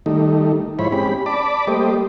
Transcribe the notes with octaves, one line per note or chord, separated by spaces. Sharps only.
D#3 G3 A3 D#4
G#2 F3 E4 C5 C#5 B5
G#3 C4 C#4 G4 B5
D5 A5 B5 D6
G3 A3 A#3 G4 C5 D#5